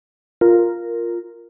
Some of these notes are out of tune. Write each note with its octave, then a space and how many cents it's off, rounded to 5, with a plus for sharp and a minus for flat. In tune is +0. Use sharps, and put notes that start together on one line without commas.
F4 +0 A#4 +0